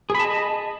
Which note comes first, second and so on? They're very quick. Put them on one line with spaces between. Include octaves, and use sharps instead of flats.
G#4 B5 A5 D#5